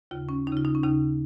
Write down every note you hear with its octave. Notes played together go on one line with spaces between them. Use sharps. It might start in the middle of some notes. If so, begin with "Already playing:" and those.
D#2 C#3 F4
C#4
D#2 D#4
C#3 F4
D#4
C#4
D#2 C#3 D#4